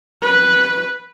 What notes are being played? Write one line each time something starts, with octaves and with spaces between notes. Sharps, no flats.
B4